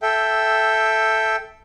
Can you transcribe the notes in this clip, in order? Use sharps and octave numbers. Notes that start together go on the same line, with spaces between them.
A4 E5 G5